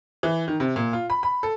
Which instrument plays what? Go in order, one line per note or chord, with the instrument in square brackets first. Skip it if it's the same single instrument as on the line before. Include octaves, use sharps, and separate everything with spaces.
[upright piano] E3
D#3
C3
A#2
F4
B5
B5
A4